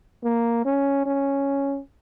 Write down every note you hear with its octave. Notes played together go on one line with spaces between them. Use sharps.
A#3
C#4
C#4